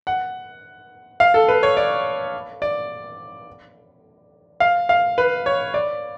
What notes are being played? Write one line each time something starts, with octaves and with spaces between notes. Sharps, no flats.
F#5
F5
A4
B4
C#5
D5
D5
F5
F5
B4
C#5
D5